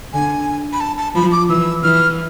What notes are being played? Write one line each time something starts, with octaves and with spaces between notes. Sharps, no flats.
D3 G#5
B5
A5
A5
F3 B5
D6
E3 E6
E3 F6